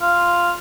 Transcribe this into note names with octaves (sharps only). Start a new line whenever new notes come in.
F4